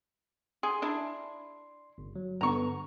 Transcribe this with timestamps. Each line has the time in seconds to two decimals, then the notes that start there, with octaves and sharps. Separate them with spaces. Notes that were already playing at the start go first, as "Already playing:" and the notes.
0.63 G#4 C6
0.82 D4 E4
1.98 G1
2.16 F#3
2.41 G2 D3 B3 A#5 C#6